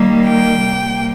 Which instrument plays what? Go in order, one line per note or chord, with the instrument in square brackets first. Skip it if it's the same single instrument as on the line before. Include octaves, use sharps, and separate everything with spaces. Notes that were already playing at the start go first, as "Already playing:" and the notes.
Already playing: [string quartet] D#3 G3 A#3
G5
C3 G3 A#3